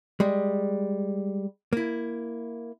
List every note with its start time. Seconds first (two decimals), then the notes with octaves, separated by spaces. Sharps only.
0.20 G3 G#3
1.73 A#3 E4